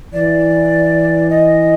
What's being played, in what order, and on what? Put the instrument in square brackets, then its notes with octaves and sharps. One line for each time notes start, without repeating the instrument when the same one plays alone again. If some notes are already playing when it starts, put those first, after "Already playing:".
[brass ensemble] E3 [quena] D5
[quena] D#5